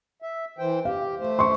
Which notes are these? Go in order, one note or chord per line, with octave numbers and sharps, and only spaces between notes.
E5
E3 C5 G5
G4 F5
A3 C5
C6 C#6